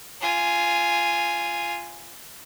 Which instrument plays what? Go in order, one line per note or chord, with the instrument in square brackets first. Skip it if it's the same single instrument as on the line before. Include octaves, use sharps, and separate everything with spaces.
[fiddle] F4 G#5